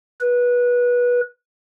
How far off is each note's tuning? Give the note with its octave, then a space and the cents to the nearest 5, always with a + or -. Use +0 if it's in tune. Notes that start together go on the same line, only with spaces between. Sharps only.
B4 -20